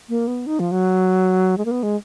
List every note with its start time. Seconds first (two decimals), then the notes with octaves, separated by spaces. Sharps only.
0.09 A#3
0.27 B3
0.47 D#4
0.60 F3
0.72 F#3
1.58 G#3
1.65 A#3
1.71 B3
1.83 G#3